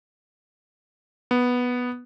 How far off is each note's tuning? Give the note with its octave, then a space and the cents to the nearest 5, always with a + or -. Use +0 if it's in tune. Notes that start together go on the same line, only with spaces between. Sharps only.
B3 -5